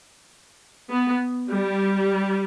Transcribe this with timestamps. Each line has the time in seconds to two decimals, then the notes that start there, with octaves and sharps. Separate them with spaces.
0.90 B3
1.49 G3